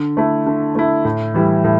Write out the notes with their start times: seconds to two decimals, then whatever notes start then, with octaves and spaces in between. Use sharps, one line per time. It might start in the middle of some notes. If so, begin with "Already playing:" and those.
Already playing: D3
0.17 A3 E4
0.47 D3
0.75 A3 E4
1.05 A2
1.34 E3 G3 E4
1.64 A2